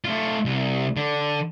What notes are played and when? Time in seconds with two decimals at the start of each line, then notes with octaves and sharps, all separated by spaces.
0.05 A3 F4
0.45 C2
0.97 D3